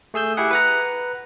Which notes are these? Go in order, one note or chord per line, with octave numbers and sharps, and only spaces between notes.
A3 G#4 E6 G6
E4 G4 G#4 F#5
B4 F#5 A#5